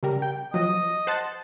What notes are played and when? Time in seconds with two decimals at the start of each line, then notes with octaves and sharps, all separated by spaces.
0.03 C#3 G3 A#4
0.22 G5
0.54 F3 F#3 D#5
1.07 C5 F#5 A5